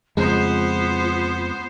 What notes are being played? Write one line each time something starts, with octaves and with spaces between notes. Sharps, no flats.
F2 C#3 G#3 B3 F4 C5